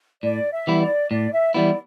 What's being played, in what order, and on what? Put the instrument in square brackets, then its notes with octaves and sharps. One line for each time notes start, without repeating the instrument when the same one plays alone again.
[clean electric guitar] A2 [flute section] D5
[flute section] E5
[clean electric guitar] E3 G3 B3 E4
[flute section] D5
[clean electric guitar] A2 [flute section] D5
[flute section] E5
[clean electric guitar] E3 G3 B3 E4 [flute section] D5